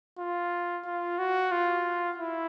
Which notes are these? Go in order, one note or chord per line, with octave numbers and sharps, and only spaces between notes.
F4
F4
F#4
F4
E4